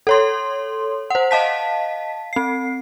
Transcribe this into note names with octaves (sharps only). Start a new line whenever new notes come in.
A4 C#5 C6
C5 F#5
D#5 F5 A5 B6
C4 C7